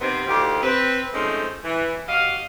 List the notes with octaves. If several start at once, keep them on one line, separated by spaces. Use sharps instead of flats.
C3 D#3 B3 C4
D2 D#3 F4 G4
C4 B4
F3 G#3 A3 C4 C#4 D#4
E3
F#4 G4 D#5 F5